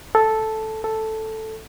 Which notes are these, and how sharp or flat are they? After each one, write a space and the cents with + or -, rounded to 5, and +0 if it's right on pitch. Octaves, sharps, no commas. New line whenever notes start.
A4 -5
A4 +0